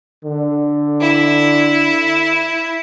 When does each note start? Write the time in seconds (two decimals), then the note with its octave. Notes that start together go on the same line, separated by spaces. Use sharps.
0.25 D3
1.01 E4